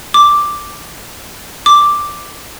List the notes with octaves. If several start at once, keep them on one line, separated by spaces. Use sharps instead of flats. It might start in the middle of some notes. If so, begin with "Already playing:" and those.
D6
D6